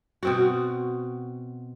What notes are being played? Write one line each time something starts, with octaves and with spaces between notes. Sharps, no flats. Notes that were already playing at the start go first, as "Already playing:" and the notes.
B2 C4 F#4